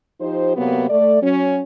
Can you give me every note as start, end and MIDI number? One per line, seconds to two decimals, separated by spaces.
0.21 0.55 53
0.21 0.55 63
0.21 0.55 67
0.21 0.55 72
0.56 0.86 48
0.56 0.86 54
0.56 0.86 58
0.56 0.86 59
0.89 1.19 57
0.89 1.19 74
1.22 1.61 54
1.22 1.61 61